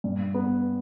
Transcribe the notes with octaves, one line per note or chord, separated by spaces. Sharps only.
G2
B3